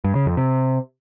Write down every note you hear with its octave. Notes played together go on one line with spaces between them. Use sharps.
G2
C#3
F2
C3